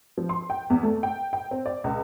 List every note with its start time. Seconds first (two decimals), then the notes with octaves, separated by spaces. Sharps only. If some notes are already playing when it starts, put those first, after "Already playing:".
0.18 F3
0.29 C6
0.50 G5
0.70 E2
0.83 A3
1.03 G5
1.33 G5
1.51 C4
1.66 D5
1.84 C#2